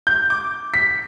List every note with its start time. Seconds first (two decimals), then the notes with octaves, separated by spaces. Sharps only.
0.07 G6
0.30 D6
0.74 B6